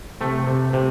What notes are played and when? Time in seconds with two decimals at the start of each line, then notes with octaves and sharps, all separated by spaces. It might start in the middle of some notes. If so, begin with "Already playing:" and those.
0.21 C3 A3
0.47 C3
0.73 C3